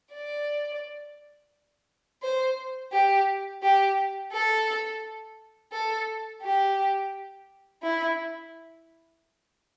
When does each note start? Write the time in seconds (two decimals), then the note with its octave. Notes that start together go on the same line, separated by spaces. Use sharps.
0.13 D5
2.23 C5
2.92 G4
3.63 G4
4.32 A4
5.72 A4
6.43 G4
7.82 E4